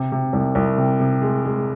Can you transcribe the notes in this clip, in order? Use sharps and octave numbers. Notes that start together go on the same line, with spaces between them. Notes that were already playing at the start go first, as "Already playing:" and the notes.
Already playing: C3
C3
C2
C2
C3
C3
G#3
G#3